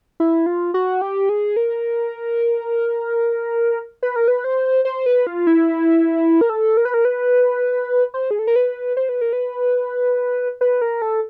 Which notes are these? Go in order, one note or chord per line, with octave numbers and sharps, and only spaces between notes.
E4
F4
F#4
G4
G#4
A#4
B4
A#4
B4
C5
C5
B4
F4
E4
A#4
A4
A#4
B4
A#4
B4
C5
G#4
A4
A#4
B4
C5
B4
A#4
B4
B4
A#4
A4